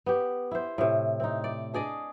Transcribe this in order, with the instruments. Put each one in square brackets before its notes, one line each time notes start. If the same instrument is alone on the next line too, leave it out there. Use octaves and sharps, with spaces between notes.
[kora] B3 G4
E4 C5
A2 C3
C4 D#4
D5
D4 G#4 D5 D#5